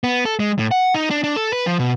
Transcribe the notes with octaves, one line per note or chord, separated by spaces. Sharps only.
B3
A4
G#3
A2
F#5
D#4
D4
D4
A4
B4
F3
B2